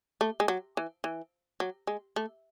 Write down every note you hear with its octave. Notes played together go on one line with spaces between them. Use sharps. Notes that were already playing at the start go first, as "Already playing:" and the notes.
A3
G#3
F#3
E3
E3
F#3
G#3
A3